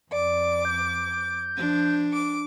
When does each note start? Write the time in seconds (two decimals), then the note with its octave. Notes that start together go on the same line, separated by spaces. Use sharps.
0.12 F2 D5 D6
0.65 G6
1.56 F3 D4
2.13 D6